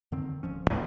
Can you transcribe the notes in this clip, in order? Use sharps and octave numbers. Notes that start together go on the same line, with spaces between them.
F2 D3 D#3 C4
D1 F3 C#4
E2 A2 G3 A#3